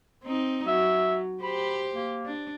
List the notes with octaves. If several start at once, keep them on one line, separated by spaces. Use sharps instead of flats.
C4 D#4
F#3 E5
G4 C5 B5
A#3
D4